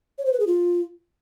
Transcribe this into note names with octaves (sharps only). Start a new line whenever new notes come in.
C#5
C5
B4
G#4
F4